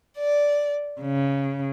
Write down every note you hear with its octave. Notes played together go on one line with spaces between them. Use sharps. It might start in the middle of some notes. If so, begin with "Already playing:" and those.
D5
C#3